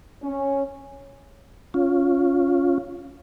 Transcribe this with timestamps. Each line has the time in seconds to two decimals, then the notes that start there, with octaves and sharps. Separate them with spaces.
0.23 C#4
1.74 C#4 F4